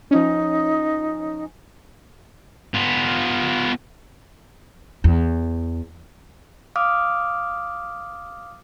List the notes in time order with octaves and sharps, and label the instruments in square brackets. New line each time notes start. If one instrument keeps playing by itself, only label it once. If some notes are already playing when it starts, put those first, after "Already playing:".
[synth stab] F3 C#4 [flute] D#4
[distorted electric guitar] B3 F4
[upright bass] E2
[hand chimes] F5 D6 D#6 F6